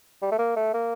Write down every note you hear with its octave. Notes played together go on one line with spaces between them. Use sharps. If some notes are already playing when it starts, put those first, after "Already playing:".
G3
A3
A#3
A3
A#3